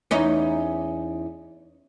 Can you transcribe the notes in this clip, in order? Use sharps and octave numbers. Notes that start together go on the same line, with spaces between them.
E2 C#4 D#4